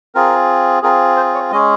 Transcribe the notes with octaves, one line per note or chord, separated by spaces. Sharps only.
C4 F4 G#4 A#4
C4 F4 G#4 A#4
C5
C#5
G#3 C#4 G#4 D#5